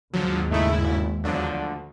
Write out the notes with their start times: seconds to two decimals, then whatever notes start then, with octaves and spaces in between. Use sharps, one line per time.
0.13 D#2 G#2 D3 F3 F#3 G#3
0.50 G1 C#3 A3 D#4 E4
0.80 G#1
1.24 E2 D3 F3 F#3 D4
1.53 D2